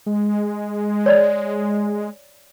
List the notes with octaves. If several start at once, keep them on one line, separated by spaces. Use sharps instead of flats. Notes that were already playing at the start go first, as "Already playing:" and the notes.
G#3
C#5 D5